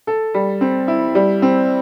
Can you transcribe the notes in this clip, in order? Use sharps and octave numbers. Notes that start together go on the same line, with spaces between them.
A4
G3
C4
E4
G3
C4